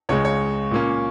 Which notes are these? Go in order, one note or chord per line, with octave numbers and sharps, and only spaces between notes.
C#2 C#3 G#3 C#5
C#5
A#2 A#3 C#4